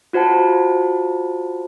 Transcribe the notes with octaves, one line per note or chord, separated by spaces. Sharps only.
F4 F#4 C5 F#5 A5